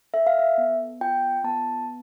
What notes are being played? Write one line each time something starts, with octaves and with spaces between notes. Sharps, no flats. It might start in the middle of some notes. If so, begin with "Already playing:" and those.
A4 E5
F5
E5
B3
F4 G5
B3 A5